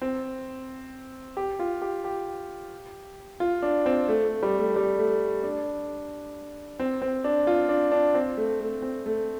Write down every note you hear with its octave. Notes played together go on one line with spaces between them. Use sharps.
C4
G4
F4
G4
G4
F4
D4
C4
A3
A3
G3
A3
G3
A3
D4
C4
C4
D4
F4
D4
D4
C4
A3
A3
C4
A3